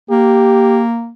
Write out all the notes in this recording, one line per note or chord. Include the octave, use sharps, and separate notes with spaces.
A#3 G4